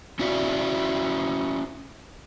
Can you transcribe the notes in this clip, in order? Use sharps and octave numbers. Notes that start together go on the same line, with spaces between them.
C#4 E4 F#4 D5 E5 F5